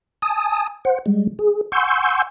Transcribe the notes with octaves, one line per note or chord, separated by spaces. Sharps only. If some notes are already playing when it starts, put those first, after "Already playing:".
G#5 A5 D#6
C5 F#5
G3 G#3
G#4
F#5 G#5 C6 C#6 E6 G6